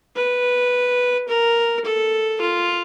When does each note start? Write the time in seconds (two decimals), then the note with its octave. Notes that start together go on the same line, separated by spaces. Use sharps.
0.16 B4
1.28 A#4
1.85 A4
2.41 F4